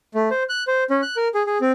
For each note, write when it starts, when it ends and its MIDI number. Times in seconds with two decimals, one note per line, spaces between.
0.15 0.29 57
0.31 0.43 72
0.49 0.63 90
0.67 0.84 72
0.90 1.01 61
1.02 1.16 90
1.17 1.28 70
1.35 1.43 68
1.47 1.58 68
1.61 1.72 60